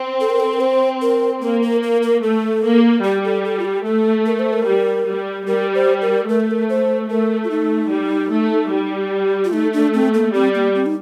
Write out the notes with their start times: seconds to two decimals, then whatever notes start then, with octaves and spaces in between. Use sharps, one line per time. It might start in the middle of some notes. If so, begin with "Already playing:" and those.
Already playing: C4
0.20 A4
0.30 A#4
0.40 A4
0.54 A#4
0.61 C5
1.02 A#4
1.42 A#3 A#4
1.62 A#4
1.83 A#4
2.03 A#4
2.23 A3 A4
2.64 A#3
3.04 G3 G4
3.25 A4
3.45 A4
3.59 F4
3.65 G4
3.86 A3 A4
4.26 A#4
4.39 C5
4.53 A#4
4.66 G3
5.07 G3
5.47 G3 A#4
5.75 C5
6.01 A#4
6.29 A3 A#4
6.40 A4
6.51 A#4
6.69 C5
7.10 A3 A#4
7.44 F4
7.50 D#4
7.91 G3
8.31 A3
8.72 G3
9.44 F4
9.53 A3 D#4
9.73 D4
9.94 C4
10.14 A#3
10.34 G3 C4
10.55 A#3
10.75 C4
10.86 D#4